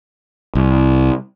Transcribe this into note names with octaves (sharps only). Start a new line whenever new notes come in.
C2